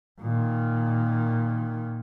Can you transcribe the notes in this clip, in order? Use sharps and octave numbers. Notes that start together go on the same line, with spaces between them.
A#2 D#3